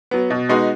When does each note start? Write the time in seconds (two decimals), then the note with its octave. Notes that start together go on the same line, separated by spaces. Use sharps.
0.11 F#3 B3
0.30 B2
0.49 G#3 B3 D#4 F#4